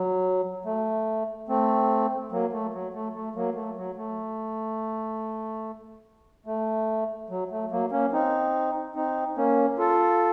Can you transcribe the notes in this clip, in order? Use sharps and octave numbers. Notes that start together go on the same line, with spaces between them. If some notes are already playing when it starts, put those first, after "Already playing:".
Already playing: F#3
A3
A3 C4
F#3 A#3
A3
F#3
A3
A3
F#3 A#3
A3
F#3
A3
A3
F#3
A3
F#3 A#3
A#3 C#4
C4 D#4
C4 D#4
A#3 C#4
F4 A4